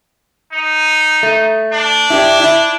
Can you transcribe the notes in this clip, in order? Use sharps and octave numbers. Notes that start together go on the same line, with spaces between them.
D#4
A3
D4
E4 G4 D5
E4